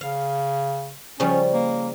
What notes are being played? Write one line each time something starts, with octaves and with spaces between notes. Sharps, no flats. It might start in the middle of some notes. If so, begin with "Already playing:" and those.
C#3 F5
C#3 F3 G3 C#4
A#3